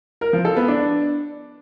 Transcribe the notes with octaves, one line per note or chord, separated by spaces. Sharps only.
A#4
F3
A4
B3
D4